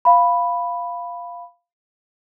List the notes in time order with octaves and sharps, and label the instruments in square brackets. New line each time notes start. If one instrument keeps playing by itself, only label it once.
[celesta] F5 B5